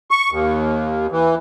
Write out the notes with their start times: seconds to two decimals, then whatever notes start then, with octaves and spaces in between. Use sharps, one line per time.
0.11 C#6
0.31 D#2
1.12 E3